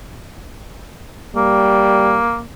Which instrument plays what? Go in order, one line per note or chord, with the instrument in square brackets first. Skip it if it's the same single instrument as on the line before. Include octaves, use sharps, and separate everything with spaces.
[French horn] G3 [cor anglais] A#3